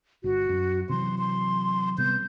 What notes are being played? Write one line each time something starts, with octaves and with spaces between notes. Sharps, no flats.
G1 F#4
F#2
C3 E3 F#3 C6
C6
C3 G3 B3 G6